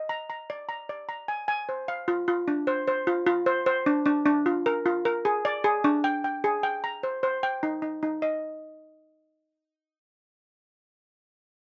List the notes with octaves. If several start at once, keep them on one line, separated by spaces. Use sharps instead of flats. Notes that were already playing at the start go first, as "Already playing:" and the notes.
Already playing: D#5
A#5
A#5
D5
A#5
D5
A#5
G#5
G#5
C5
F5
F4
F4
D4
C5
C5
F4
F4
C5
C5
D4
D4
D4
F4
A#4
F4
A#4
G#4
D5
G#4
D4
G5
G5
G#4
G5
A#5
C5
C5
G5
D#4
D#4
D#4
D#5